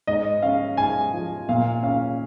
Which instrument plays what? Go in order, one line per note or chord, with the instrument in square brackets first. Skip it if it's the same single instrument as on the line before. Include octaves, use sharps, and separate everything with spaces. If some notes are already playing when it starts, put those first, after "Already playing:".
[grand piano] G#2 D#5
C#4 F5
G#2 G#5
F3
A#2 F5
C#4 F5